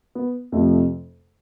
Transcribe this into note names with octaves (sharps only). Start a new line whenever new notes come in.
B3
F2 C3 F3 A3